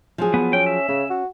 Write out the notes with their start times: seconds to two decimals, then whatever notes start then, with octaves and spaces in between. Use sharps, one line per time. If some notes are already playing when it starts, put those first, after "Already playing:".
0.18 F3 F#3 G#4
0.34 B3
0.53 C#4 G5
0.66 E5
0.88 C#3 C#4
1.10 F#4